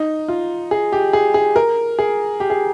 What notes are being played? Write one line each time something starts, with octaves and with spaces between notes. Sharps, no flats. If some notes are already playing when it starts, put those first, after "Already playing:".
Already playing: D#4
F4
G#4
G4
G#4
G#4
A#4
G#4
G4
G#4